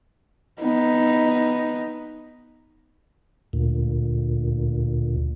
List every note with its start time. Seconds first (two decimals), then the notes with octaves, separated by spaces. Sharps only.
0.62 B3 D#4
3.53 D2 A#2